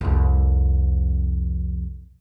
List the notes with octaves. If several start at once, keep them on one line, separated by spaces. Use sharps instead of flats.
C2 F2